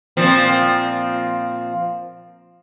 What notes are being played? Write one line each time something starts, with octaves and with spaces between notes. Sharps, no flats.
A#2 F3 C4